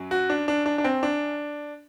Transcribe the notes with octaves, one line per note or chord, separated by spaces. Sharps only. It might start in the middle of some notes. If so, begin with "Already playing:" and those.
Already playing: F#2 F#3
F#4
D4
D4
D4
D4
C4
D4